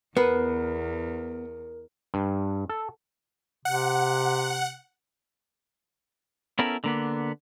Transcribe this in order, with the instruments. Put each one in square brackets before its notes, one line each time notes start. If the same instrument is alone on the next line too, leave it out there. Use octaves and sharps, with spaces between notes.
[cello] E2 [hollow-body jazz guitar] B3 [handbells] A#4 [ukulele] B4
[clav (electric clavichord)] G2
A4
[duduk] C3 [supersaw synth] F#5
[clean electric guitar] B3 C#4 E4 A4 A#4
D3 A#3 B3